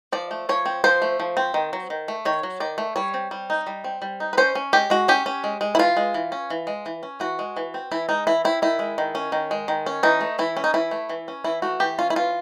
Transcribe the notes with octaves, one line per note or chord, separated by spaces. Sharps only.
F3 D5
A3
F3 C#5
C4
F3 C5
A3
F3
C4
D#3
F#3
D#3
A3
D#3 C#5
F#3
D#3 D5
A3
G3 C#5
C4
G3
D#4
G3
C4
G3
D#4
B4
C#4 C5
C#4
G#3 G4
G#3 F#4
C#4 G4
C#4
G#3
G#3
E4
E3 F4
G#3
E3
C#4
E3
G#3
E3
C#4
E3 F#4
G#3
E3
C4
E3 E4
G#3 D#4
E3 E4
C4 E4
D#3 E4
G#3
D#3
C#4
D#3
G#3
D#3
C#4
E3 D#4
A3
E3 E4
C#4
D#4
E3 E4
A3
E3
C#4
E3 E4
A3 F#4
E3 G4
C#4 F4
E4
E3 F4